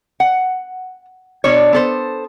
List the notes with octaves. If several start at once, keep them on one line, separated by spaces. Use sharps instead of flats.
F#5
B2 D4 C#5
B3 A4 C5